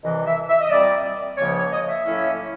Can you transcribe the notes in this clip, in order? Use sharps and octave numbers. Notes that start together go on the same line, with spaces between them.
C2 C3 E3 D#5
E5
E5
D#5
A#2 G3 C4 D5
C#2 C#3 F3 A#3 C#5
C#5
D#5
E5
A2 F#3 A#3 C#4 E4